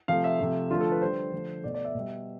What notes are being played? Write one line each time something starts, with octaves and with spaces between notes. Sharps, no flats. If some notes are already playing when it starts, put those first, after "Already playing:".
C3 F3 A3 F5
E5
C3 F3 A3
D3 F3 A3 F4
A4
B4
D3 G3 C5
D3 F3 A3
B2 A3 D5
D5
E5
B2 G3